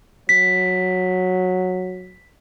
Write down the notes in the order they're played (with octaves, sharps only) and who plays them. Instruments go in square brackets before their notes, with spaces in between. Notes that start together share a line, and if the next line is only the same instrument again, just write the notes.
[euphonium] F#3 [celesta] B6